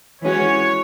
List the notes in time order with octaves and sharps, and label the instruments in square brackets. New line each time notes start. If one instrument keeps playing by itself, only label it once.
[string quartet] E3 G#3 C#4 F#4 [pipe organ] C#5